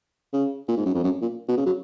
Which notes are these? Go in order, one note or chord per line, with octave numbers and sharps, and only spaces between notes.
C#3
A#2
G#2
F#2
F2
F#2
A#2
B2
C#3
F#3